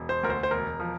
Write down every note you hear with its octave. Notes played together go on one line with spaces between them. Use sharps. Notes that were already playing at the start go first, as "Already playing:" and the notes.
Already playing: E1
C5
D2 A#4
C5
C5
E1 A#4
F3